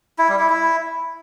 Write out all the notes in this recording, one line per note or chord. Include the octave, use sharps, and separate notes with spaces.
E4
G3
E4
E4